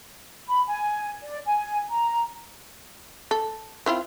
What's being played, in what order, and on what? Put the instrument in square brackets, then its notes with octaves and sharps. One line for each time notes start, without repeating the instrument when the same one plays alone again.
[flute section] B5
G#5
D5
G#5
A#5
[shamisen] A4
C4 E4 F4